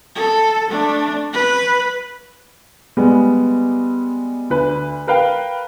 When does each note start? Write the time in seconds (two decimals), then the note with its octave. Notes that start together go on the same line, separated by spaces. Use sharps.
0.16 A4
0.69 A3 D4
1.34 B4
2.97 G3 G#3 B3
4.50 D2 B4
5.07 A#4 B4 F5 G5